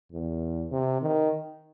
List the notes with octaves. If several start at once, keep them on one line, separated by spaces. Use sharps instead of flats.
E2
C3
D#3